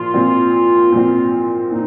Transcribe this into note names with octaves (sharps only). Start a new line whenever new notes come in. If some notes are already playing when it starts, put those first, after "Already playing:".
Already playing: A#2 F3 F4
A#2 F3 C4
A#2 F3 C4
A#2 D#4